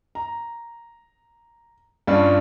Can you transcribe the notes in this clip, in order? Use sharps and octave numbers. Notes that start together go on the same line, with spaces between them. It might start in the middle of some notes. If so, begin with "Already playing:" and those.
A#5
G2 G3 C#4 D4 F4